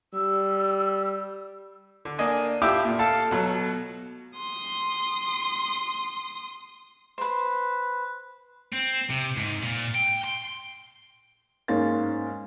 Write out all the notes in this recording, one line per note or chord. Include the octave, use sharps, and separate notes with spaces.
G3 E6
D3
A#3 D4 D#5 G#5
A2 F4 G4 E5 G5 D6
A#2
A4 F5 A5
B2 F#3 A3
C6 D#6
B4 C5
C4
C3
G#2
A#2
G5
C6
G#2 A#3 C#4 F5 C6 A6